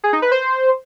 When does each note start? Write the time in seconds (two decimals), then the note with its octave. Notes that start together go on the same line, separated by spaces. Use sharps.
0.04 G#4
0.13 D#4
0.22 B4
0.31 C5